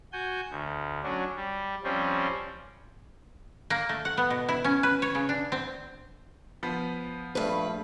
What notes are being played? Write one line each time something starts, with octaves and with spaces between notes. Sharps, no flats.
F#4 G#5 G6
D2
F#3 C#4 D4
G3
F3 G3 C4 C#4
A#3
A3
F#5
B3
B2
E4
C#4
B4
C#5
C#3
D4
C4
F3 B3
A#1 G2 A3 B4